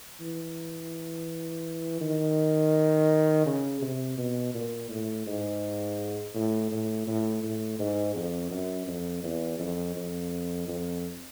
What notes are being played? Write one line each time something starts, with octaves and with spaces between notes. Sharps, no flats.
E3
D#3
C#3
C3
B2
A#2
A2
G#2
A2
A2
A2
A2
G#2
F2
F#2
F2
E2
F2
F2
F2